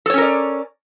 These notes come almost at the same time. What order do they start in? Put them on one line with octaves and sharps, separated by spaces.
A4 C#5 C#4 A#4 D5